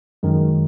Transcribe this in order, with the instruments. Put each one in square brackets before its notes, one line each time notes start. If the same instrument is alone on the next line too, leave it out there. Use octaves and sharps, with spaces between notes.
[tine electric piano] F#2 D#3 G#3